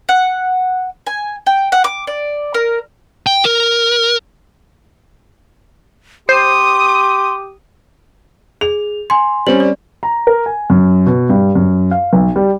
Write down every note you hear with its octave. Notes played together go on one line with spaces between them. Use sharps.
F#5
G#5
G5
F#5
D6
D5
A#4
G5
A#4
G4 C5 C6 D#6
G#4 F7
G#5 C6
G3 C4 C#4 F#7
D5
A#5
A#4
G#5
F#2
B2
G2
F#2
F5
B1
G3